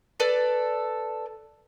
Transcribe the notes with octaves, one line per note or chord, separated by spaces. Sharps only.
A4 B4 D5